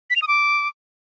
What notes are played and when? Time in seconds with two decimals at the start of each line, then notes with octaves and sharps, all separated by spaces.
0.10 B6
0.16 F7
0.22 D#6
0.28 D6